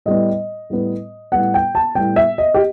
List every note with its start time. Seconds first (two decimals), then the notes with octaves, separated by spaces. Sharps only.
0.06 A2 G3 B3 D#5
0.70 A2 G3 B3
1.32 A2 G3 B3 F#5
1.54 G5
1.75 A5
1.95 A2 G3 B3 G5
2.16 E5
2.38 D#5
2.54 G4